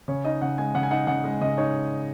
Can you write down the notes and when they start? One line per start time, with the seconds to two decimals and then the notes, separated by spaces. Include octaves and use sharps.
0.08 C#3 C#5
0.25 D#4 D#5
0.42 C#3 F#5
0.58 G#3 G#5
0.75 C#3 F#5
0.83 G#5
0.91 D#4 F#5
1.07 C#3 F#5
1.24 G#3
1.41 C#3 D#5
1.58 D#4 C#5